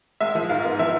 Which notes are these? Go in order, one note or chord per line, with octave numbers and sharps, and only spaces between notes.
G#3 E5
F3
G#2 F5
B3
F3 E5